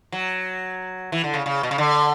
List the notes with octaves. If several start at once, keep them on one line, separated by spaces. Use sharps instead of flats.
F#3
E3
D3
C#3
C#3
B2
C#3
D3